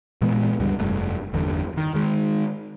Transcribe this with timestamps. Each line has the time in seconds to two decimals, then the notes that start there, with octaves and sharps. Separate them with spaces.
0.22 A#2 E3 G#3 B3
0.60 C#2 G2 D3 G3
0.78 F1 G2 A3
1.33 G1 E2 G2 D3
1.77 D#3
1.94 D#3 G#3